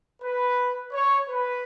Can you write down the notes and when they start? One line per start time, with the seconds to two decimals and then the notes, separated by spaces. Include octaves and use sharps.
0.23 B4
0.93 C#5
1.29 B4